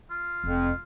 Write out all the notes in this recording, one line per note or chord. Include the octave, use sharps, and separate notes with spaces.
F4
F1 F2